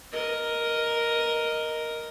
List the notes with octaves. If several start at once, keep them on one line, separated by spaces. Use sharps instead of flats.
A#4 D#5